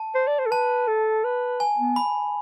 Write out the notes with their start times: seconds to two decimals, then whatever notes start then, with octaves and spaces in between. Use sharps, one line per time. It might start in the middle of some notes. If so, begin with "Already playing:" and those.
Already playing: A5
0.15 C5
0.28 D5
0.39 C5
0.46 A4
0.51 B4 A5
0.88 A4
1.24 B4
1.60 G#5
1.78 B3
1.96 B5